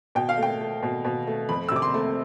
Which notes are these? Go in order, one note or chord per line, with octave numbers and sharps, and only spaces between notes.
B2 G5
F5
A3 G5
A3
B2
B2
A3
F2 B5
E6
C3 D6
C6
A3